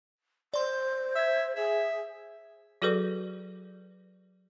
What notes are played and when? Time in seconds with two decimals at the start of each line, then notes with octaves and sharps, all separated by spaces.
0.54 C5 D5 C6
1.15 E5 E6 G#6
1.56 G#4 E5
2.82 F#3 F#4 G#4 A4 B4 D5